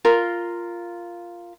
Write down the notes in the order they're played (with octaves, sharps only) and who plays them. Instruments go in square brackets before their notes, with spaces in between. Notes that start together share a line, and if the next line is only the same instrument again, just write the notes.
[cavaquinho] F4 A#4 C6